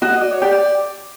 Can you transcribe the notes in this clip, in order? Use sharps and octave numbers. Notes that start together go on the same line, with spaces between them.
F#4 D#5
D#5
D5
C#5
G4 D5